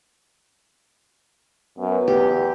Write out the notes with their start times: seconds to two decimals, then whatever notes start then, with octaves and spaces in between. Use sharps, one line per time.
1.78 F#2 B3 B4
2.08 E2 G4